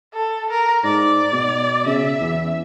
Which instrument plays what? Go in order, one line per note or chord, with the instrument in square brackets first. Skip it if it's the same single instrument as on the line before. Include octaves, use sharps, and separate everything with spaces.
[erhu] A4
A#4
[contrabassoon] G#2 [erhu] D5
[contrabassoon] B2
[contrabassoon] C#3 [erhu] E5
[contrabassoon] E2